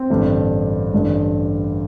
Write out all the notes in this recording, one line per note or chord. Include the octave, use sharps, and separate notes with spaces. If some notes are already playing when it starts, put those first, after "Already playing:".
Already playing: C4
A1 G2 D3
A1 G2 D3